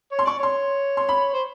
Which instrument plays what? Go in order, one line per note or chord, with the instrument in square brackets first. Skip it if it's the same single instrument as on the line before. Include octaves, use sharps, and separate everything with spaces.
[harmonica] C#5
[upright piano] C6
[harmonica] D5 [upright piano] C#6
[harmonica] C#5 [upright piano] C6
[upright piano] C6
B5
[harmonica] C5